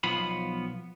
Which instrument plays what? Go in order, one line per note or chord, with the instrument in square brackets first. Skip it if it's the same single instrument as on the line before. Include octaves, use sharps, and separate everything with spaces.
[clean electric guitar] B1 F3 B3 B5